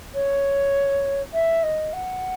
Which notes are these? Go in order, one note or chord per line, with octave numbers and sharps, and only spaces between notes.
C#5
E5
D#5
F#5